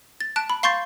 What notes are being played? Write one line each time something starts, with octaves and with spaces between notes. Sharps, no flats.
A6
A5 F#6 D7
B5
F5 C6 C#6 G6 A6 C7